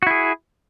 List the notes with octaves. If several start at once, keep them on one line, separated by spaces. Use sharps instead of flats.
E4 F#4 G#4